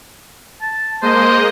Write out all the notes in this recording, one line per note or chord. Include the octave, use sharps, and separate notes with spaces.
A5
G#3 A#3 C5 D#5